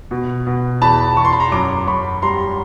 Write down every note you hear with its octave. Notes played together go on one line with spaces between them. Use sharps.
B2
B2
E2 A5 B5
E2 C#6
C6
B5
A#5 C6
F#2 C6 D6
F#2 B5 C#6
G3 A#5 C6